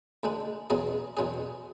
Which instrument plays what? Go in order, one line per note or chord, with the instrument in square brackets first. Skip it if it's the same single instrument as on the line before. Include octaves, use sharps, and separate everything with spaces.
[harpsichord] D2 D3 G#3 D4
E2 B2 F#3 C#4 G#4
E2 B2 F#3 C#4 G#4